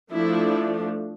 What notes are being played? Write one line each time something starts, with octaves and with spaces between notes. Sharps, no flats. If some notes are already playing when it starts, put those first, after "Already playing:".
F3 A3 D4 E4